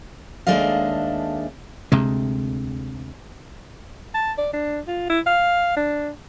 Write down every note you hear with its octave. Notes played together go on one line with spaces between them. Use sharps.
D#2 G#3 A3 D4 D#5 F5
D2 C3 G#3
A5
D5
D4
F4
E4
F5
D4